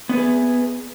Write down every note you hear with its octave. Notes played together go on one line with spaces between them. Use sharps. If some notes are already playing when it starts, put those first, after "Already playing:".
B3 G#4 B4